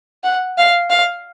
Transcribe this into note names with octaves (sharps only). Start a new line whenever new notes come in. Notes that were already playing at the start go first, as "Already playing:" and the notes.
F#5
F5
F5